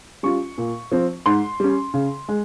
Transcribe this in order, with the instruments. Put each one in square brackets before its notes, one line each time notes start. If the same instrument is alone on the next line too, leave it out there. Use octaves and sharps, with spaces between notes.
[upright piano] G3 C#4 F4 C#6
A#2
F3 C4
G#2 C6
G3 C#4
C#3
G#3